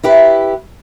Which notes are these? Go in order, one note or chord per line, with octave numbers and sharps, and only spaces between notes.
E4 G4 B4